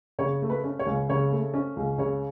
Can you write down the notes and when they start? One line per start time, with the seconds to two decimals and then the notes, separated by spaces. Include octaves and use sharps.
0.19 C#3 C#5
0.42 A3
0.50 B4
0.64 C#4
0.79 C#5
0.86 C#2
1.09 C#3 C#5
1.32 A3
1.54 C#4
1.77 C#2
1.98 C#3 C#5